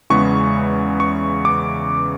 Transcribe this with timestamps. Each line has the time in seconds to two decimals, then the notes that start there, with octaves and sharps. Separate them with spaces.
0.10 E2 C#3 E3 G#3 B3 C#6
1.00 C#6
1.45 D6